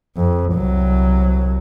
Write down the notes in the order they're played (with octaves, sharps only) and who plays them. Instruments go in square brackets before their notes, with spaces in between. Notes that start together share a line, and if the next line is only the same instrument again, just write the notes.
[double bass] F2
C2 F#3